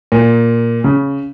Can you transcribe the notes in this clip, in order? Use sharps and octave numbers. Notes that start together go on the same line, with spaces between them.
A#2
C#3